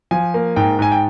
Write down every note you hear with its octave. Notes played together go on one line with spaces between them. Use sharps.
F3 G#5
A#3
G#2 G5
G#2 G#5
G5